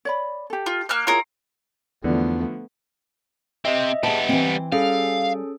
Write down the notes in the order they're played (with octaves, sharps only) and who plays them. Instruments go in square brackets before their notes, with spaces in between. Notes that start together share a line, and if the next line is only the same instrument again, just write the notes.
[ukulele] C#5 D5 B5
G4 A4
[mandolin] F4
A#3 F6 F#6
[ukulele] E4 G#4 C#5 [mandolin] F4 A#4
[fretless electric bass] E2 [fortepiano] D3 F3 [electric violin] A3 B3
[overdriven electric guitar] C3 C4 [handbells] D#5 E5
[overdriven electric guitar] G3 B3 [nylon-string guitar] G#4 A5
[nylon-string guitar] E3 C4
[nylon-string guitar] G3 [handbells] C#4 G#4 A4 [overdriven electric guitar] F5